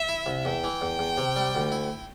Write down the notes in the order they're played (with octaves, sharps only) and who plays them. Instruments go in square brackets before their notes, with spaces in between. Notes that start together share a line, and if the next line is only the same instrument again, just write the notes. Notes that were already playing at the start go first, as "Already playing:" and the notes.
Already playing: [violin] E5
[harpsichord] E4
C2
[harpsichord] E2 [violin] G5
[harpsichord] E3
E2
E2
C3
G3
D2
E4